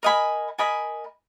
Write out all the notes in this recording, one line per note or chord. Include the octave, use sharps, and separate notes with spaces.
A#4 D#5 G#5 B5
A#4 D#5 G#5 B5